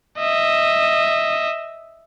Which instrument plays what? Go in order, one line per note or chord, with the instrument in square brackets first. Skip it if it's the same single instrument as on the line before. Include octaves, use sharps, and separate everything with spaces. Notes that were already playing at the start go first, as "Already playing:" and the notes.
[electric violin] D#5 E5